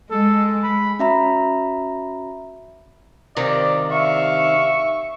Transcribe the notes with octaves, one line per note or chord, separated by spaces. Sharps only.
G#3 A4
B5
C#4 F#4 E5 A#5 B5
G2 C3 D#3 D5
E5 F5 C#6